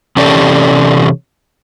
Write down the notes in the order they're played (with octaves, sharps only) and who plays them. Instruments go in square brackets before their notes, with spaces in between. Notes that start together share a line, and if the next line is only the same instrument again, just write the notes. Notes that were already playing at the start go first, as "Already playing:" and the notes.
[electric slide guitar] C3 E3 C#4 G4 A4 D5